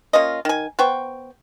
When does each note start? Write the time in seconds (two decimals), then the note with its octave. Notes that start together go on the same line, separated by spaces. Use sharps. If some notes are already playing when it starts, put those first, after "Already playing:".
0.13 A#3 C#4 F4 D#5
0.45 D#3 G#5
0.79 B3 C5 G5 C#6